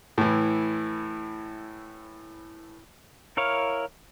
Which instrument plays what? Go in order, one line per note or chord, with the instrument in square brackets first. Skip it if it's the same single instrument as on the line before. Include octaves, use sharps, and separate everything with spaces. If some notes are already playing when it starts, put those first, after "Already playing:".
[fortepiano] A2 E3
[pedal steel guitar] E4 A#4 C#5 F5